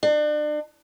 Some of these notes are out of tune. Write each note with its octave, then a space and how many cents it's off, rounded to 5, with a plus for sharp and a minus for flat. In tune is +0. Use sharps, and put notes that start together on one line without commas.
D4 +35